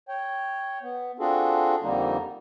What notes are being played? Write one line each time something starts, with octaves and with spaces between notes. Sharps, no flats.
C#5 G5
B3
C4 D4 F4 F#4 G#4 A4
F2 D3 G3 A#3 D#4